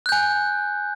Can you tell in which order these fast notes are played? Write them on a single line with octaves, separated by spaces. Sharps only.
F#6 G6 G#5